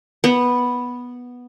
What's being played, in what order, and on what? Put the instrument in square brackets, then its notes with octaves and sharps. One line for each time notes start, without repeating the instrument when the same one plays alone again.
[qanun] B3